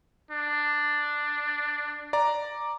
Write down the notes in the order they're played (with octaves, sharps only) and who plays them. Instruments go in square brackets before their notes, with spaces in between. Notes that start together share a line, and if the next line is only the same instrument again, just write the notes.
[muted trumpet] D4
[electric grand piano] D5 A#5